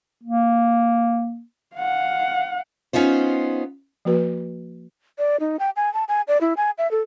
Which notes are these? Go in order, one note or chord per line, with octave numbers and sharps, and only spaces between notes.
A#3
F5 F#5
B3 C#4 D#4 F4 C5
F3 A#3 F#4 B4
D5
D#4
G5
G#5
A5
G#5
D5
E4
G#5
E5
A4